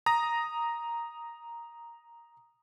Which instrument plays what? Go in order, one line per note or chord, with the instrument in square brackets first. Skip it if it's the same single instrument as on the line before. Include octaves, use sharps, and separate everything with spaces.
[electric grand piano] A#5 D#6 A#6